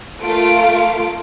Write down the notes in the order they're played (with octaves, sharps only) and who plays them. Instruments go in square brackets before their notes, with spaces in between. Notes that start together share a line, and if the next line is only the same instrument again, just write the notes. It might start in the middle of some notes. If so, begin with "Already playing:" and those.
[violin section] A3 A#3 F4 F5 D7